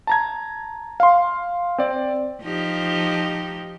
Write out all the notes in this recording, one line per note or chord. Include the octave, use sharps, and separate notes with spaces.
A5 A#5 G#6
F5 C6
C4 D5
F3 D#4 G4